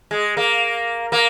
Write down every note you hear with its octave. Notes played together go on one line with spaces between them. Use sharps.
G#3
A#3
A#3